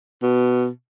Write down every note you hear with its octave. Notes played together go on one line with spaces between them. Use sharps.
B2